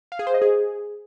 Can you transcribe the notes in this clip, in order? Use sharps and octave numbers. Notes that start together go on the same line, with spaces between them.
F5
G#4
C5
D#5
G#4